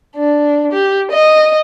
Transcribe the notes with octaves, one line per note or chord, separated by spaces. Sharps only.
D4
G4
D#5